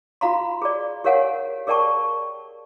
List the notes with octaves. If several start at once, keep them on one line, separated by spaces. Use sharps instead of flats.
F4 F#4 F5 A#5 C6
G#4 D5
G4 A#4 C#5 F5 F#5 G#5
G#4 A#4 D5 G5 A5 C#6